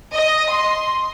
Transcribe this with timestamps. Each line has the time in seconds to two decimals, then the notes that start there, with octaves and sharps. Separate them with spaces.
0.13 D#5
0.50 C6